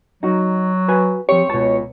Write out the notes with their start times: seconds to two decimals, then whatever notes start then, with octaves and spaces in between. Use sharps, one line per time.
0.23 F#3 D#4 F#4
0.88 F#4 B4 G#5
1.29 F3 C4 G4 C#5
1.50 C#2 B2 A5